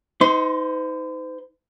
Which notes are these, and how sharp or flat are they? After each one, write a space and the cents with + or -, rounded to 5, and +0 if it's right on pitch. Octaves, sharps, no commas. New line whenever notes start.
D#4 +25 C5 -45 C6 +0